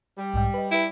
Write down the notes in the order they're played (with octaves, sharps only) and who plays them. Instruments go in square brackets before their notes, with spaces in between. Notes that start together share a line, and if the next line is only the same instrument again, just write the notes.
[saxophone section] G3
[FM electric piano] B1 G#2 G5
B4 D#5
[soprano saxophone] E4 [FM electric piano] B4 E5 G5